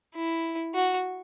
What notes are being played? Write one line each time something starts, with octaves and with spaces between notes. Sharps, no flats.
E4
F#4